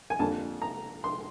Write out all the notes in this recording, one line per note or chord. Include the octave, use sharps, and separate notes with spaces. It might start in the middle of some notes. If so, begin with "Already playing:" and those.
G#5
F2 D3 G3 A#3 A5
A#5
C6